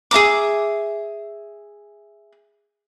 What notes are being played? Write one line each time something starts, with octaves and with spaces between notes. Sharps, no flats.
G#4 E5 A#5 D6